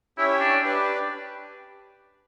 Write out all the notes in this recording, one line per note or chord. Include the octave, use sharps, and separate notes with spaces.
C#4 E4 G4 C#5 E5 G5
D4
D4 G4 B4 D5